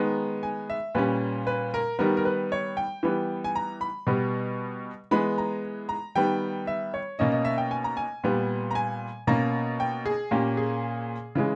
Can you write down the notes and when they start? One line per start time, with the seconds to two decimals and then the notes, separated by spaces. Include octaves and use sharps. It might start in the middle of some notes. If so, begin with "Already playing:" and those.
Already playing: D#3 G#3 B3 A#5
0.43 G#5
0.70 E5
0.95 A#2 G3 C#4 B4
1.47 B4
1.74 A#4
1.99 D#3 G3 B3 A#4
2.17 A#4
2.25 B4
2.52 C#5
2.77 G5
3.03 E3 G3 B3
3.44 G#5
3.55 A#5
3.81 B5
4.07 B2 G3 B3
5.11 E3 G#3 B3 B5
5.38 A#5
5.89 A#5
6.15 D#3 G3 B3 G5
6.67 E5
6.94 C#5
7.19 B2 A#3 C#4 D#5
7.32 D#5
7.45 E5
7.58 G5
7.71 G#5
7.84 A#5
7.97 G#5
8.24 A#2 G3 B3
8.71 A#5
8.75 G#5
9.27 B2 A#3 C#4 A#5
9.80 G5
10.06 G#4
10.31 A#2 A#3 C#4 G4
10.57 G#4
11.35 C#3 E3 G#3